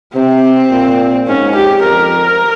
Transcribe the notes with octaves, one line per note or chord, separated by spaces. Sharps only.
C3 C4
A#2
G#2 C#4
G4
F2 A#4